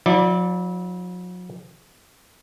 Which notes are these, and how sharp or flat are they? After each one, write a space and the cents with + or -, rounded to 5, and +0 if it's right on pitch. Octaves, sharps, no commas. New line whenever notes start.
F#3 -45 E4 -30 D5 +0